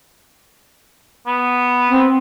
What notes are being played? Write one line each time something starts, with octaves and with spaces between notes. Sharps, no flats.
B3
C4